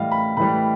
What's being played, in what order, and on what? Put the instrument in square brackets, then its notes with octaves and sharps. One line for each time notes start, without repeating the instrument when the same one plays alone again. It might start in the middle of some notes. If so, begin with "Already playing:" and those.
Already playing: [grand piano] A2 E3 G3 D#5 F5
B5
A2 E3 G3 B5